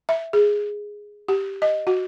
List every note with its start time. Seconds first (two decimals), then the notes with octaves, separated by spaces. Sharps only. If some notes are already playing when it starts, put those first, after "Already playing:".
0.09 E5
0.33 G#4
1.28 G4
1.62 D#5
1.87 F#4